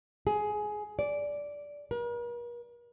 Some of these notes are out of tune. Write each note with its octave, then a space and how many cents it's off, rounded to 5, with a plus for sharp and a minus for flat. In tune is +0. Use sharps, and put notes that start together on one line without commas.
G#4 +15
D5 -10
A#4 +45